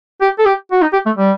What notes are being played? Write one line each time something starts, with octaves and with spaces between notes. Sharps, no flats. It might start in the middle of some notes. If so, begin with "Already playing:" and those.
G4
A4
G4
F#4
D#4
G4
A3
G3